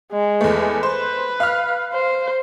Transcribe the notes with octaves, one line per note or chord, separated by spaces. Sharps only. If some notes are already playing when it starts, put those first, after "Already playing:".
G#3
E2 A3
B4 C5
F5 F6
C5